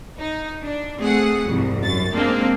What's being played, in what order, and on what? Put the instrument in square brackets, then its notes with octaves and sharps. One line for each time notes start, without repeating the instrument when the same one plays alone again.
[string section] D#4
D4
A3 C4 G#4 F#5
C2 F2 G#2
F#2 A6
G#3 A#3 C4 D4